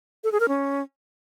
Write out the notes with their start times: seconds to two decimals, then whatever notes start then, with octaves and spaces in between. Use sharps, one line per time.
0.24 A4
0.32 G#4
0.40 A#4
0.48 C#4